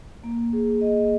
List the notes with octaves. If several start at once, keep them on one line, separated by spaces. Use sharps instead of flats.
A#3
G#4
D#5